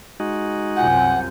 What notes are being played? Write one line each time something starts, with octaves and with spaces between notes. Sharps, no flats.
G#3 D#4 F#4
C2 F#2 C3 F4 F#5 G#5 G6